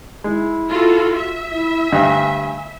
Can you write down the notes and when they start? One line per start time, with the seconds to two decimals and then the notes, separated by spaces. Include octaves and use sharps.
0.24 G#3 E4
0.69 F4 F#4 A4
1.16 E5
1.52 E4
1.92 D2 G2 D#5 G#5